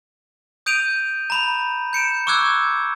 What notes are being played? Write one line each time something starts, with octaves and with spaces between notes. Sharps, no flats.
D#6 G6 D7 D#7 F7
A#5 B5
G6 C#7 D7 E7
C#6 D6 E6 F#6 G#6